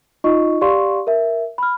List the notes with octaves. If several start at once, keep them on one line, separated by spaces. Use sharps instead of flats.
D#4 F4 D#5 C#6
G4 D5 F5 C6 C#6
A#4 E5
B5 F6